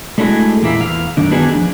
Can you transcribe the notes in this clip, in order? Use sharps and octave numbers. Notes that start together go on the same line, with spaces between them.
G#3 A3 D4 E4 F#4 G#4
E2 A#2 A#3 E4
E2 F5
F#2 D#3 D4
B3 D4 D#4 F#4 G#4
F3 G3 D4